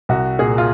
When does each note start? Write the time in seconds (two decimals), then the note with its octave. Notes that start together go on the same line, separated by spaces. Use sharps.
0.09 C2 F#4
0.39 A#2 G#4
0.58 F4